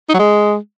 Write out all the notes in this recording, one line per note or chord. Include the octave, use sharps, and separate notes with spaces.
D#4
F#3
G#3